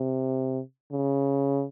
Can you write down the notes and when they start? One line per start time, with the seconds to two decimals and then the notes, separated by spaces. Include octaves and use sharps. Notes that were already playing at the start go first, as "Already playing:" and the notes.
Already playing: C3
0.92 C#3